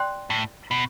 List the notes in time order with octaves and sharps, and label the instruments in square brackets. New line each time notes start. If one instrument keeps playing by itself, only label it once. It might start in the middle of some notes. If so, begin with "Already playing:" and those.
Already playing: [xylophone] D5 G5 C6 F#6
[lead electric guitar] A2
B2